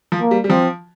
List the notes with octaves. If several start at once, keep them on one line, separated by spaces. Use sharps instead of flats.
F3
A#3
G3
G3
F3 C4